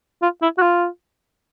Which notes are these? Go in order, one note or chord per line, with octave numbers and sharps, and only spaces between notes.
F4
E4
F#4
F4